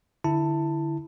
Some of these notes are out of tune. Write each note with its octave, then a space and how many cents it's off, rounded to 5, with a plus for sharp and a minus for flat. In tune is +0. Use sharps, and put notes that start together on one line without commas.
D3 +5 E4 +0 A5 +15